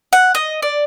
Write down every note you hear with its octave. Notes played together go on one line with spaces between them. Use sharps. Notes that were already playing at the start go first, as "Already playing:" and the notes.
F#5
D#5
D5